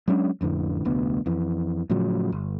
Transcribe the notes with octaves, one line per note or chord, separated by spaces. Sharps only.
F#3 G#3 C#4 D4
A1 F2 D3 E3
F1 D2 B3
F2 E3
A2 C#3 F3 F#3
G1